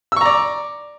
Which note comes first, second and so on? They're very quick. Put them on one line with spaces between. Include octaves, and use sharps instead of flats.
E6 C#6 A#5 D5